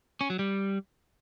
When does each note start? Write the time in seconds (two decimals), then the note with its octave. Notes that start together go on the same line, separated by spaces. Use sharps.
0.21 C#4
0.30 F#3
0.39 G3